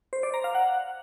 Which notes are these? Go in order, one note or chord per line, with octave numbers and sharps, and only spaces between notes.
C5
D5
A#5
F5
F#5